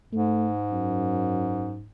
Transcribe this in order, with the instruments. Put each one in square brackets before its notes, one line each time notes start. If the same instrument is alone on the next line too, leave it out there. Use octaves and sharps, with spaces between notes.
[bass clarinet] G#2 [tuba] A3
[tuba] F#2